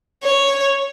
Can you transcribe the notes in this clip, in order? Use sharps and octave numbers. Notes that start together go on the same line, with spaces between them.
C#5